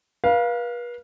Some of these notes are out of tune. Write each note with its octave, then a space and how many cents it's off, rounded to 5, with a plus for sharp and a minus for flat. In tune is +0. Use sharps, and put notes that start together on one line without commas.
B4 -40 F5 +0